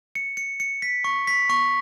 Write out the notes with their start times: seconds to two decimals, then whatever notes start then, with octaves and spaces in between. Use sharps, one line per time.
0.15 C#7
0.37 C#7
0.60 C#7
0.82 B6
1.04 C#6
1.27 B6
1.50 C#6